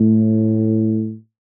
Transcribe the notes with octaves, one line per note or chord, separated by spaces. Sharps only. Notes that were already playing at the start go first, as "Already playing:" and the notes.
Already playing: A2